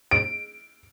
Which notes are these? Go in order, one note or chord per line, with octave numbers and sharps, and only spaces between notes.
D7